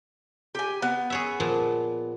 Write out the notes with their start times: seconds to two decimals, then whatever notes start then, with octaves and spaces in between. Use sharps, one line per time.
0.55 G4 G#5
0.82 B3
1.10 G#4 C#5 E5
1.40 A#2 F3